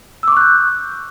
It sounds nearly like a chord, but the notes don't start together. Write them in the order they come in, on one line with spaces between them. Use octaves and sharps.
E6 D6 C#6 F#6 G6